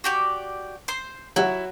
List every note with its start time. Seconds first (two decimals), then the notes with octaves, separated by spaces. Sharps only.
0.04 F#4 G4 D5
0.88 C5 C6
1.36 F#3 E4 F#4